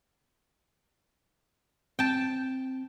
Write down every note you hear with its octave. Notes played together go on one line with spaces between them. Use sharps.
C4 G5 A5